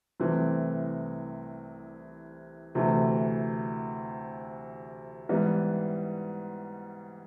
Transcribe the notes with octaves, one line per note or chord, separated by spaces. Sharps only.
C2 C3 E3 A3 C4
D2 C3 E3 A3
G#2 E3 G3 B3